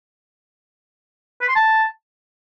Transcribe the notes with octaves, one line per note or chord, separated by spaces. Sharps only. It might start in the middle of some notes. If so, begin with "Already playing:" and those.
B4
C6
A5